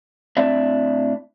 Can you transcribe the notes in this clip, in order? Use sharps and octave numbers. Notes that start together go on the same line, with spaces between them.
A2 C4 D4 D5 E5